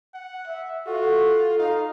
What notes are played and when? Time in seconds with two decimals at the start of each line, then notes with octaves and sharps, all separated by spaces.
0.14 F#5
0.48 E5
0.87 F4 F#4 A4
1.59 D#4 F5